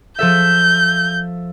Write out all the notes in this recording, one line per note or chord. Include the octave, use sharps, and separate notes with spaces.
F3 A4 E5 G6